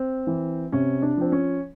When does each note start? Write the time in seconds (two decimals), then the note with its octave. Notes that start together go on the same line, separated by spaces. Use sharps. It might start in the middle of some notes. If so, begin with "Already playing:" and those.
Already playing: C4
0.27 E3
0.72 C3 C#4
1.02 D4
1.17 F3 C4
1.32 C#4